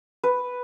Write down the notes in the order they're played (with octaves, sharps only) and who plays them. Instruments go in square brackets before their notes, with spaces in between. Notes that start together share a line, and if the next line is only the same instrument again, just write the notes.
[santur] B4